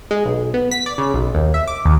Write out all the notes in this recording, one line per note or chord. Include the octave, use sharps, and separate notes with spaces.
G#3
B1
B3
B6
D5
C#3
B1
D#2
E5
D6
D#2